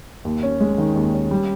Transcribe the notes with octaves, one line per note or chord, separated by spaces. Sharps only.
D#2
C#4
G#3
D#3
D#2
C#4
G3